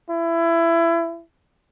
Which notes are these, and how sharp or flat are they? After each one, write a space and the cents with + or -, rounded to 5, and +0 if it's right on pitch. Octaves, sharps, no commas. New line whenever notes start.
E4 +25